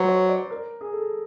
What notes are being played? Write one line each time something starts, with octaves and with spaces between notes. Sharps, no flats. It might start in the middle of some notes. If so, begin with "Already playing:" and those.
Already playing: F#3 B4 C5
C#5
D5
A#4
G#4
A4